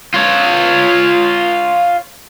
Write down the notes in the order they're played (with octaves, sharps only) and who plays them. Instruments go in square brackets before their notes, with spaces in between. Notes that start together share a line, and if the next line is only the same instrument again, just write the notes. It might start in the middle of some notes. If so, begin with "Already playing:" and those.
[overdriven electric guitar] F4 C#5